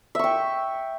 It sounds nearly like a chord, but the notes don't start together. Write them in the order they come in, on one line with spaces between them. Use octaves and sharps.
E5 C#6 G5